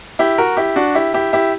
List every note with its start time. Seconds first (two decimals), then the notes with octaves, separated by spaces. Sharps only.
0.19 E4 G4
0.38 F#4 A#4
0.57 E4 G4
0.76 D4 F#4
0.95 E4 G4
1.14 E4 G4
1.33 E4 G4